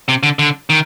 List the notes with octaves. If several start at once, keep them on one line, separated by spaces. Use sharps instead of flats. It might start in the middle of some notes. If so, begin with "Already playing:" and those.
C3
D3
D3
D#3